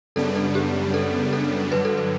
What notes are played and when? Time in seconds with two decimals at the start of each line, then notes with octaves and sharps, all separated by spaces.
0.16 F#2 C#3 G3 B3 D4 A4
0.35 A4
0.55 G4
0.94 A4
1.33 A4
1.72 G2 D3 F#3 B4
1.85 A4
1.98 B4